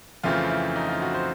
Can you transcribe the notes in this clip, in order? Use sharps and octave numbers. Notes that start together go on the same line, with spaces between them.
F2 C#3 E3 A3 C4 F4
E4
D#4
F4
F#4
C5